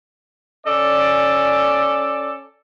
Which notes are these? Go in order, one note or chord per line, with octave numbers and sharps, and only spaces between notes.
C#4 A4 D5